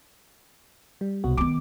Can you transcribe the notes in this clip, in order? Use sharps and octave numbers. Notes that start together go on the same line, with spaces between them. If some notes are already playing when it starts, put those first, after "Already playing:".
G3
C2 B2 F#4
D#3 B3 D6